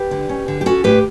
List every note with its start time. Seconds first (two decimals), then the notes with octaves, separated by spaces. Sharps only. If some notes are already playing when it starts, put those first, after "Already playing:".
Already playing: G4 B4
0.11 D3
0.29 C#4
0.48 D3
0.61 G4
0.66 C#4 F#4 A4
0.84 A2 G4 B4